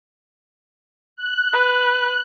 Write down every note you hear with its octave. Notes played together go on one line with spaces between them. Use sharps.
F#6
B4